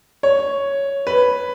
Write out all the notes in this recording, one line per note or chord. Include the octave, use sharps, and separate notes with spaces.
C#5
B4